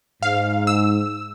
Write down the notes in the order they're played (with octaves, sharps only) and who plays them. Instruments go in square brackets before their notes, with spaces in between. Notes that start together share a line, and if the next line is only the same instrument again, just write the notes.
[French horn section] G#2 [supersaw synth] F5
[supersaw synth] E6